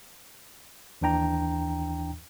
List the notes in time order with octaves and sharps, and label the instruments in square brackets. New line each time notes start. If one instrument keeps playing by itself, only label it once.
[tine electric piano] D#2 E3 D4 G5 A#5